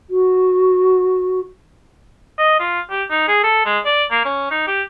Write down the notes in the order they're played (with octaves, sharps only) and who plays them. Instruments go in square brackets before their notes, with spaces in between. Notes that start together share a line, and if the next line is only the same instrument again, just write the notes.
[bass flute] F#4
[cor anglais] D#5
F4
G4
D#4
G#4
A4
G#3
D5
A#3
C#4
D#4
G4